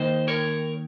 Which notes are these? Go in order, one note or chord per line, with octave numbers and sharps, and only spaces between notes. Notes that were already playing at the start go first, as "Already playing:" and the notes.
Already playing: D#3 A#3 D#4 C5 D#5
A#4 C#5